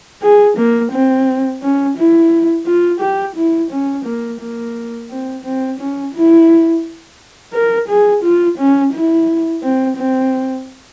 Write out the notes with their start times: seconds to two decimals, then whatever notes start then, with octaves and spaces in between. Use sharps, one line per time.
0.22 G#4
0.57 A#3
0.92 C4
1.62 C#4
1.97 E4
2.66 F4
3.01 G4
3.36 E4
3.71 C#4
4.06 A#3
4.40 A#3
5.10 C4
5.45 C4
5.79 C#4
6.15 E4
7.54 A#4
7.88 G#4
8.23 F4
8.58 C#4
8.93 E4
9.63 C4
9.97 C4